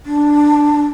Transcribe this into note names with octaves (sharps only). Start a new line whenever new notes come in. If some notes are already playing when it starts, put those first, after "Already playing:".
D4